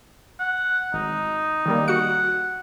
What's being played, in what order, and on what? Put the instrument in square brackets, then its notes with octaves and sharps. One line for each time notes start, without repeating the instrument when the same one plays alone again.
[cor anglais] F#5
[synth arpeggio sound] G#1 [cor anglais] D#4
[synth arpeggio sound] D#3 G3 A#3
[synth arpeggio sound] F#4 C#7 [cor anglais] F#5